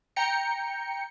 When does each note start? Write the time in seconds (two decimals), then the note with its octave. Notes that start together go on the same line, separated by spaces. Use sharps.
0.16 G5 A#5 C#7